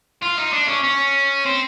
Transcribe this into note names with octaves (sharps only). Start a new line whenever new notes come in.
F4
D#4
D4
C#4
C#4
C4